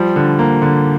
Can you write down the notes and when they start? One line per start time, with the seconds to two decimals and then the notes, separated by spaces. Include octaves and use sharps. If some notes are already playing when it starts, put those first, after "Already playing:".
Already playing: F3 G3
0.16 D3
0.39 A#3
0.62 D3